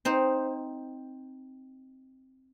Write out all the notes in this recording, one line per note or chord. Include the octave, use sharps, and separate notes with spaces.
C4 D#4 C5